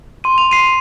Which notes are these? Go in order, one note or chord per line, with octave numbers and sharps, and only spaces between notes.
C6 D#7
F7
C7 D#7